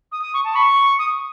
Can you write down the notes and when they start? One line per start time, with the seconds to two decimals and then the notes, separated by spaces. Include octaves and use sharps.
0.12 D#6
0.22 D#6
0.34 C#6
0.44 A5
0.55 B5 C#6
0.99 D#6